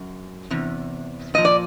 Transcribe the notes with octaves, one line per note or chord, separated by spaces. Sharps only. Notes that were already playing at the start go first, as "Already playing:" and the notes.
Already playing: F#2
E2 C3
A#2 F3 D#5
D5